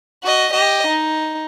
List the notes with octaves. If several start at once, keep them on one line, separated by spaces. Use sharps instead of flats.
F#4 D#5
G4 D#5
D#4